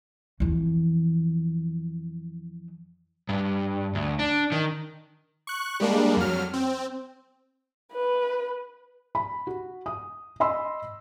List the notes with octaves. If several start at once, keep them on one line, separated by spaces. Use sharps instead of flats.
F2 E3
G2
D2
D4
D#3
C#6 F#6
G3 G#3 A#3 D4
F2 F#3 F6
C4
B4
B5
F#4
D#6
D#5 B5 C6 E6